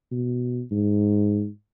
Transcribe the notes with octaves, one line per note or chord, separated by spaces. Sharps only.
B2
G#2